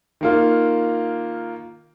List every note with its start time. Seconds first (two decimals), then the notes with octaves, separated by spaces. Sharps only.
0.21 D#3 A#3 F4